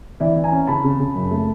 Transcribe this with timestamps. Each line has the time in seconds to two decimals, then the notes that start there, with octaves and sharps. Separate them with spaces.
0.20 E3 D5 E5
0.36 E3
0.44 G#5 A#5
0.52 C#4
0.67 C#3 A5 B5
0.84 C#3
1.00 C#3
1.15 F#2
1.31 A3